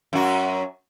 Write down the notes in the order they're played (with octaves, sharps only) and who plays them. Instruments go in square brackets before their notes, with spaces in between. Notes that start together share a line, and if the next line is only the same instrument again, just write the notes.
[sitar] F#2 F#4